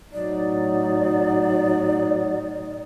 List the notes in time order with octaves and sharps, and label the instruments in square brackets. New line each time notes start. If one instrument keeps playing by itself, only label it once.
[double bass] A2 D#4 [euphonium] F#3 [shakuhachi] D5